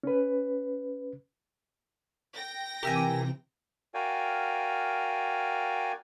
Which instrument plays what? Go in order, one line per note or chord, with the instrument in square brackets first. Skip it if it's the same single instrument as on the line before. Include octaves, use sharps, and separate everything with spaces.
[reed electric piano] C#4 B4
[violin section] G5 A#6
[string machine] C3 E3 [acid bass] G4 [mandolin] A#4 E5 G#5
[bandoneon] F#4 A#4 D5 F5 G5 G#5